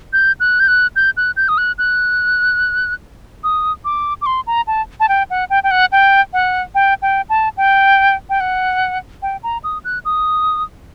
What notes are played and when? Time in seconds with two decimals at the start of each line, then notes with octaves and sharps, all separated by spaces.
0.13 G6
0.40 F#6
0.60 G6
0.68 F#6
0.96 G6
1.17 F#6
1.36 G6
1.48 D#6
1.58 F#6
1.78 F#6
3.44 D#6
3.85 D6
4.21 D6
4.26 C6
4.47 A#5
4.67 A5
5.00 A5
5.09 G5
5.30 F#5
5.50 G5
5.63 G5
5.71 F#5
5.92 G5
6.33 F#5
6.75 G5
7.02 G5
7.30 A5
7.57 G5
8.29 G5
8.40 F#5
9.22 G5
9.43 A#5
9.64 D#6
9.84 F#6
10.05 D#6